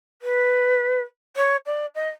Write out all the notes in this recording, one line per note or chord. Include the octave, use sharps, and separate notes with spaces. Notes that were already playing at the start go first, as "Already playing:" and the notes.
B4
C#5
D5
D#5